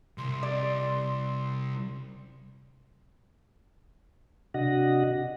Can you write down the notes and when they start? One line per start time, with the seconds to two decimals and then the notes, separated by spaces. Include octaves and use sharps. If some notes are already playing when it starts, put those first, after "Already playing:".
0.18 C2 C6
0.43 D5
4.54 C3 D4 F#4 D#5 F#5 A#6